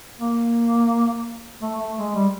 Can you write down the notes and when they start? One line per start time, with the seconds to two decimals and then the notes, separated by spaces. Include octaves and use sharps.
0.19 A#3
1.62 A3
1.79 A3
1.98 G#3
2.15 G3